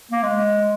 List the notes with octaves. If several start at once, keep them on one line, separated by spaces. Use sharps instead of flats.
A#3
G#3